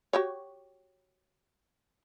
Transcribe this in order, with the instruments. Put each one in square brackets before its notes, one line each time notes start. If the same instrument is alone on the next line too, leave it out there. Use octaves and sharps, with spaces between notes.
[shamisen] F#4 G4 C#5